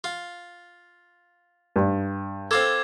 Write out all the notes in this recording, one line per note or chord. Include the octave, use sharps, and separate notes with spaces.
F4
G2
C4 F4 A4 D6 G#6